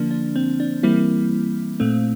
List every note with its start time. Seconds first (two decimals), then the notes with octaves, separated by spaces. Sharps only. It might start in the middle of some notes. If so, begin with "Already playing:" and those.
Already playing: D3 F3 A#3 D4
0.11 D4
0.36 C4
0.60 D4
0.83 E3 G3 A#3 C4 E4
1.80 A#2 A3 C4